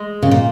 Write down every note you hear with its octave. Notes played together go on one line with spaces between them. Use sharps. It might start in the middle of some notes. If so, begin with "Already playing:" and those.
Already playing: G#3
C#3
A#2